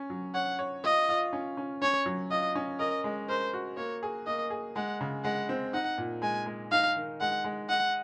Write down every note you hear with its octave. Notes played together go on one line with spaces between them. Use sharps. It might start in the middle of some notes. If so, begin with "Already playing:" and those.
Already playing: C#4
F#3
C#5 F#5
C#5
F4 D#5
F4
C#4
C#4
C#4 C#5
F#3
F4 D#5
C#4
A#4 D#5
G#3
A#4 C5
F#4
A#3 C#5
G#4
A#3 D#5
G#4
G#3 F#5
C#3
G#3 F#5
C4
D#4 F#5
A#2
G#3 G#5
G#3
D#4 F5
D#3
G#3 F#5
G#3
D#5 F#5